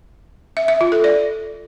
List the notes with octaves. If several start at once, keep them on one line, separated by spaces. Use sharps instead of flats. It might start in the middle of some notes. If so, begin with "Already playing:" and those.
E5
E5
F4
A4
D5